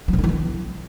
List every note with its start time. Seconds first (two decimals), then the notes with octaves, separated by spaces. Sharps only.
0.08 F#3
0.13 B2
0.18 D3
0.24 E3
0.29 B3